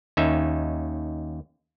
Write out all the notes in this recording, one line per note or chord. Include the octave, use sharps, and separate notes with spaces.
D#2 C#4 D#4 E5